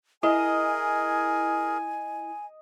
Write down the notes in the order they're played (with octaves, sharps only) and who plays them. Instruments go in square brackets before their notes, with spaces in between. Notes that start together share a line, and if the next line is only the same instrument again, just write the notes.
[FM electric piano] E4 [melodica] G#4 A#4 [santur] D#5 [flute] G#5